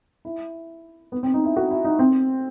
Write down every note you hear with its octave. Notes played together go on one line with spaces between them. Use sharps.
E4
B3
C4
D#4
E4
F#4
E4
D#4
C4